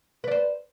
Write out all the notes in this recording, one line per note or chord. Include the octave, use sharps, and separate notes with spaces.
B4 C5 D5